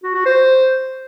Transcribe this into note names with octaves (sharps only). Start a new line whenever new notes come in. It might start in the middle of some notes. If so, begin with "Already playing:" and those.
F#4
F#4
C5